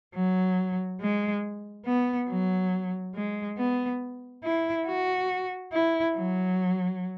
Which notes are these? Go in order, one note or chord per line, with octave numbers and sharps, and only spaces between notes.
F#3
G#3
B3
F#3
G#3
B3
E4
F#4
E4
F#3